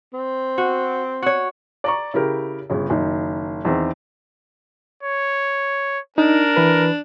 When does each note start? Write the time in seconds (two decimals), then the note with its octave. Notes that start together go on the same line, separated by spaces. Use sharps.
0.13 C4
0.58 F#4
1.22 F#4 C#5
1.84 D5 A#5 C#6
2.14 C#3 E4 G4 A#4
2.70 G1 C#3
2.90 F#1 D#3
3.65 E2 D#3 C4
5.03 C#5
6.18 D4 D#4 A#4
6.57 E3 B4